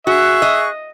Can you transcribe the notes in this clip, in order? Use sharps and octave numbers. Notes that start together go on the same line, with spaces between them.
F#4 G#4 E5 C#6 F#6
D#5